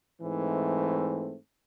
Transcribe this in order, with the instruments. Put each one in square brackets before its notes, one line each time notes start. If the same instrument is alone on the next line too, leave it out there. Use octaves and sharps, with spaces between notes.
[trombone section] G#2 E3 A3 C4